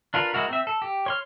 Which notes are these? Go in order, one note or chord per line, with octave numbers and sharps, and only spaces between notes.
D4 F4 A#4 B4
G#3 E4 F#4 A#4
C4 E5
A4
G4
C#5 C6 F6